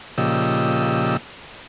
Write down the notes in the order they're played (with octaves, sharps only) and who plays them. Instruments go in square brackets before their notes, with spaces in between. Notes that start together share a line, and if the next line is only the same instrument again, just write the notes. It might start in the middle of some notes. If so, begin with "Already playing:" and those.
[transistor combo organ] A#2 C#3 F3 G4 D#5 E6